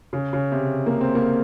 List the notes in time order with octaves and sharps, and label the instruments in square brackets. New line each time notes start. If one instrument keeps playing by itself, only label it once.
[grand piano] C#3
C#3
C3
A#3
C4
A#3